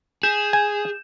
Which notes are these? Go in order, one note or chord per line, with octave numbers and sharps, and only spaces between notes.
G#4 G6 E7
G#5